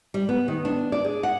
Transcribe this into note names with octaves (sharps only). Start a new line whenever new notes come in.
G3
B3
D#3
D4
D5
G#4
F#5